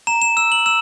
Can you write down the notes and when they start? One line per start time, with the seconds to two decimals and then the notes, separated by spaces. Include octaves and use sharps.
0.07 A#5 E7
0.22 E7
0.37 E6 E7
0.52 F#7
0.66 E6 E7